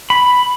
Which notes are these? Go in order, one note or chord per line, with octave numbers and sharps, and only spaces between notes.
B5